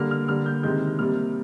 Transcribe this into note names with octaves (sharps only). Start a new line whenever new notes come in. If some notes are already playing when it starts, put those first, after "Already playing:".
Already playing: D3 G3 A#3 F6
F6
D3 G3 A#3 F6
G6
C3 D#3 G#3 G6
C3 G3 A#3 F6